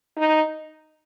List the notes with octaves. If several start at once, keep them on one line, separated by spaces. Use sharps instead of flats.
D#4